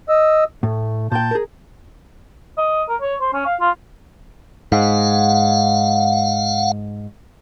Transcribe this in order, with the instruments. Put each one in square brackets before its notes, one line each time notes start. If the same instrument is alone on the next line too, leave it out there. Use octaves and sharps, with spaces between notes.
[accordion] D#5 E6
[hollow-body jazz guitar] A2 [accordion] A3
[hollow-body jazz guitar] A#2 G5 [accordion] A5 G6
[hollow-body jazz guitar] G#4 A#4
[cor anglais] D#5
A#4
C#5
C5
C#4
F5
F4
[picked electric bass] G#2 [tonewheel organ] F5 F#5